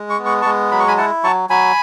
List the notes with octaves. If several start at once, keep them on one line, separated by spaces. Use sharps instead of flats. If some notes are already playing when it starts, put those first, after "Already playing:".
Already playing: G#3
C#6
B3
C#6
G#3 A5 C#6
F#3 B5
C#6
G#5 B5
E4 F#5 A5
F#3 A5 C#6
F#3 G#5 B5